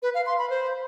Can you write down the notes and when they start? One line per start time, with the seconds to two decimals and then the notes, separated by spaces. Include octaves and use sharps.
0.03 B4
0.14 F5
0.26 C6
0.38 B5
0.50 C5